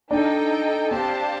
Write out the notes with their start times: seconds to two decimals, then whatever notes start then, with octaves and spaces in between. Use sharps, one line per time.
0.11 D4 D#4 A4 D#5 G5
0.91 C4 D4 G4 C5 F5 A5